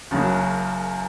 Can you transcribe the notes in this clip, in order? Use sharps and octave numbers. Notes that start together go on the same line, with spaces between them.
F#1 F#2 C#3 F#3